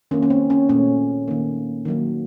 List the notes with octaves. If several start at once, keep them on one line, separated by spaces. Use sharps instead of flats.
D#3 A#3 C#4
C#4
C4
C#4
A#2 A3 C#4
D#3 A#3
D#3 F#3 A#3